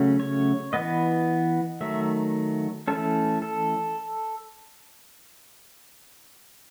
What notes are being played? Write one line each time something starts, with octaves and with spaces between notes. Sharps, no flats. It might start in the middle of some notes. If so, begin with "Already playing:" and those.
Already playing: C#3 F#3 A3 C#4
C#5
E3 B3 D#5
D#3 F#3 A3 E5
E3 A3 C#4 A4
A4